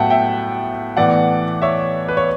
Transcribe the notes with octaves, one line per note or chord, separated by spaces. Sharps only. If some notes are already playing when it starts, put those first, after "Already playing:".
Already playing: A2 F#3 B3 E5 F#5 G5 A5
E5 G5
A2 E3 B3 D5 F#5
C#5 E5
B4
C#5